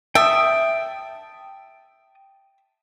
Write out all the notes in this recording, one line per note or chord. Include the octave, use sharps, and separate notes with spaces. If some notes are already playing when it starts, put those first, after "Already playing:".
E5 G5 A5 D#6